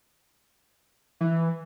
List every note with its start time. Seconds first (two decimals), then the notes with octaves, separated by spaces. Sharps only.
1.21 E3